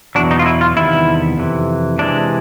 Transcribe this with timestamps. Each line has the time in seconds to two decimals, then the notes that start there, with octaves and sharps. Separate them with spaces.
0.15 E2 B2 F#3 D4
0.31 D#4
0.39 F4
0.46 E4
0.61 F4
0.76 E2 C3 D#3 G3 B3 E4
1.38 F2 C3 E3
1.99 C3 E3 G#3 D4